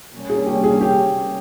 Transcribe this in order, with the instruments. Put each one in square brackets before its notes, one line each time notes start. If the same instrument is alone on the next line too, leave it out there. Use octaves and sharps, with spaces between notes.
[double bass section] C3 G3 A#3 C#4
[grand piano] G#4
G4
G#4
G4